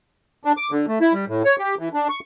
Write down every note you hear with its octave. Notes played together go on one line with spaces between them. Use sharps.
D4
D6
D3
A3
E4
G3
A2
C#5
G4
E3
D4
C#6